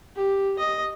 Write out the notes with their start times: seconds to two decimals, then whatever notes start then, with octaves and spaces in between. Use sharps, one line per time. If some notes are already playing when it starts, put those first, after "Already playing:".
0.16 G4
0.59 D#5